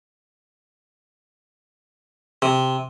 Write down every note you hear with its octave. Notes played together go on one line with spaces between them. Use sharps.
C3